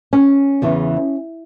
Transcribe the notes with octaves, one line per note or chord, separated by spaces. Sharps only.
C#4
E2 C#3 E3